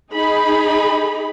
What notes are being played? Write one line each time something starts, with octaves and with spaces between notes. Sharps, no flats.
D#4 G#4 B5